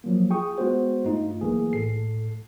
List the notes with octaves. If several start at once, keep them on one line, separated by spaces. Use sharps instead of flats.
F3 F#3 A#3
F4 G#4 G5 C#6 D#6
G#3 B3 F#4 C5
G2 A3 D#4 F4
B1 E3 A3 A#3 G#4
A2 A4 C7